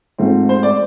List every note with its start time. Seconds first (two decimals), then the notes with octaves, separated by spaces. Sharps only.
0.18 G#2 F3 A3 C4
0.49 C5
0.63 D5